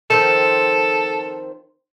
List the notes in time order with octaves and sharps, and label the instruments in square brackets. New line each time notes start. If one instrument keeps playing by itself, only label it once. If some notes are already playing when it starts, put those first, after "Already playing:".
[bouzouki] D#3 F3 C4 [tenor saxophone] A4